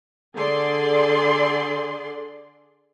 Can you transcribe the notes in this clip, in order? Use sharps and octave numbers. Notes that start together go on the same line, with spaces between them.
D3 G#4 D5 C6